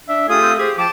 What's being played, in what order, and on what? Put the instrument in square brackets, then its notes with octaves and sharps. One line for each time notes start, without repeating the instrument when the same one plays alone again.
[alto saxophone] D4 [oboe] E5
[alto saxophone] A3 [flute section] F4 G4 D#6 [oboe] G#4
[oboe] C4
[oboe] G4 [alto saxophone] G#4 [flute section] C5
[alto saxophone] F3 [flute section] G5 A5 [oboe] D6